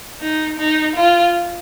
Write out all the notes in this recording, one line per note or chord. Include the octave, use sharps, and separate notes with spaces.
D#4
D#4
F4